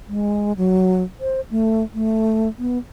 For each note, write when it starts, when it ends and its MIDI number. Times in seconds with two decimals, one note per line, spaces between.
0.08 0.53 56
0.57 1.03 54
1.20 1.41 72
1.51 1.84 57
1.94 2.48 57
2.58 2.78 59